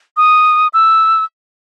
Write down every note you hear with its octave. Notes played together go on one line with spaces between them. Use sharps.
D#6
E6